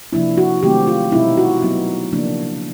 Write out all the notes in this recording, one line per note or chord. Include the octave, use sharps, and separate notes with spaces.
C3 F3 A#3 D4 E4
F#4
C3 D#3 F#3 A3 C4 G4
F4
B2 G3 C4 D#4 E4
F#4
F#3 B3 D#4
C#3 F3 A#3 D4